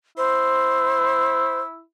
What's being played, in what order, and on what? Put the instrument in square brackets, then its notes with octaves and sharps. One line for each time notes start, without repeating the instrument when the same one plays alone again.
[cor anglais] E4 [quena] C5